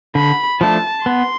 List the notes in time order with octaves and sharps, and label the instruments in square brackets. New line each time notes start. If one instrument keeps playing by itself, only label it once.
[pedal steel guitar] D3 [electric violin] B5
[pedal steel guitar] F3 A3 D4 [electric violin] A5
[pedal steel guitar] B3 [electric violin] C6